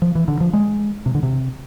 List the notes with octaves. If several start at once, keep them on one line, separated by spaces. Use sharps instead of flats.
F3
E3
D3
F3
G#3
C3
D3
C3